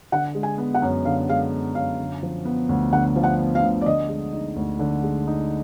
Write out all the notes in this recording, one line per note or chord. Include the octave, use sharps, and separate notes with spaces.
D3 F#5
G#3
G#5
B3
F#5
F#2
D3 F5
G#3 F5
B3
F#2 F5
D3
F3
B3
D2
D3 F#5
F3
F#5
B3
F5
D2
D5
D3 D#5
G#3
D#4
D2
D3
G#3
D#4